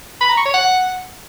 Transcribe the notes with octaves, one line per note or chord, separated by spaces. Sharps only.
B5
A#5
C#6
C#5
F#5